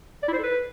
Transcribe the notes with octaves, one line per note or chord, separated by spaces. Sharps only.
D5
E4
C5
A4
B4